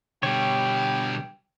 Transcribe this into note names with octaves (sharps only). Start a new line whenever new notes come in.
B2 D3 G3 G4 C#5 G5